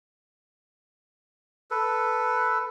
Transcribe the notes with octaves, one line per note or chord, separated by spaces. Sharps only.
A4 B4